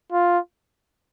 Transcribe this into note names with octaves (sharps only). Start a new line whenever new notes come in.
F4